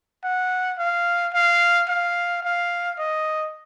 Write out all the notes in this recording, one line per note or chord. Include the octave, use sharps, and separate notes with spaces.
F#5
F5
F5
F5
F5
D#5